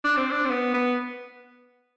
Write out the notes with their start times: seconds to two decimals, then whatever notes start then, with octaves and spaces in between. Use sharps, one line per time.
0.04 D4
0.17 C4
0.31 D4
0.45 C4
0.50 B3
0.74 B3